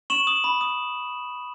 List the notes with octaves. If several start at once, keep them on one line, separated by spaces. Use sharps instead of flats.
C#6 E7 F#7
D#6 E7 F#7
B5
D#6